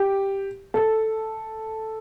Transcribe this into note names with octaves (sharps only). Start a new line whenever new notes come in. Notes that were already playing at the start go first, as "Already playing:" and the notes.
Already playing: G4
A4